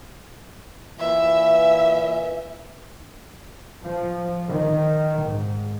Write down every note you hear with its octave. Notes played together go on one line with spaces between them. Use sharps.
A#2 E3 E5
F3
D#3
G#2